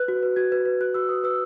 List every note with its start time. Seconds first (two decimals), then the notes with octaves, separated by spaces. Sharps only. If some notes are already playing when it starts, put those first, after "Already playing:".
Already playing: B4 F#6
0.08 F#4
0.23 B4
0.36 F#4 G#6
0.52 B4
0.65 B4
0.81 F#4 F#6
0.94 F#4 E6
1.09 B4 D#6
1.23 B4 E6